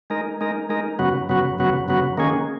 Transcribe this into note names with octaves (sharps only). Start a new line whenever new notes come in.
G#3 D#4 A#4
G#3 D#4 A#4
G#3 D#4 A#4
F#2 C#3 F#3 B3 F#4
F#2 C#3 F#3 B3 F#4
F#2 C#3 F#3 B3 F#4
F#2 C#3 F#3 B3 F#4
D#3 A#3 C#4 G#4